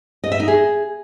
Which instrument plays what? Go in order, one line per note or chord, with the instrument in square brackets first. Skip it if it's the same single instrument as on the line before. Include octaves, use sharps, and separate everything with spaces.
[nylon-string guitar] D#5
E5
D#4
G#4